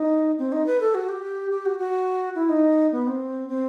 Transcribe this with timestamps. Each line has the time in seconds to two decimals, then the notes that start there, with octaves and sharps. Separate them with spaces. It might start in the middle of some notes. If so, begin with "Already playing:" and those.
Already playing: D#4
0.38 C4
0.52 D#4
0.66 B4
0.81 A4
0.95 F#4
1.09 G4
1.51 G4
1.65 F#4
1.79 F#4
2.35 E4
2.49 D#4
2.92 B3
3.07 C4
3.49 C4